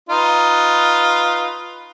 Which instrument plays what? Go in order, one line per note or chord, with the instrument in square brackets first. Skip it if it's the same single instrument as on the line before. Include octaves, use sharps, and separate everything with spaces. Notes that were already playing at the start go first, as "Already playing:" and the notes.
[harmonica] D#4 F4 B4